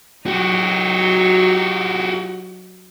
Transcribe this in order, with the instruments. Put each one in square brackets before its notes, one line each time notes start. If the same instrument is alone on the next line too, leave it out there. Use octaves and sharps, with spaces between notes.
[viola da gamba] F#3 D#4 [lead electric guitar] F#4 G4